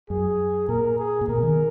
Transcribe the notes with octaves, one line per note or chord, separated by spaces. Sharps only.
F#2 G#4
A#2 A#4
G#4
A#2
B2 A#4
D#3